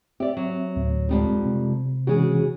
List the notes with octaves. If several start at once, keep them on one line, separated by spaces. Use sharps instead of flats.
C4 G4 D5 E5
F#3
D2 A2
F2 G3 G#3 C4 D#4
C3
C#3 E3 G#3 C#4 F#4 G#4